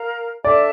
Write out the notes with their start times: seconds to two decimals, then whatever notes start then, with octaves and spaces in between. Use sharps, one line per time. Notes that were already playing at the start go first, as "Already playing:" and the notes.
Already playing: A#4 F5 A#5
0.44 D4 A4 D5 E5 A5